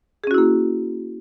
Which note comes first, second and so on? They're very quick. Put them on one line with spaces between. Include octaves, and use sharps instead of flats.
G#4 C#4 F#4 E4 A#3